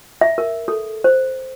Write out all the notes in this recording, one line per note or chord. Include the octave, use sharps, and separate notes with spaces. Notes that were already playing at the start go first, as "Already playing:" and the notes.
E5
A#4
A4
C5